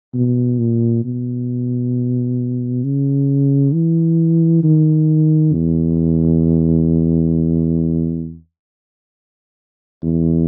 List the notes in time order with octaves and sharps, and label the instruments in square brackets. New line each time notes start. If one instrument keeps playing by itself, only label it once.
[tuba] B2
A#2
B2
C#3
E3
D#3
E2
E2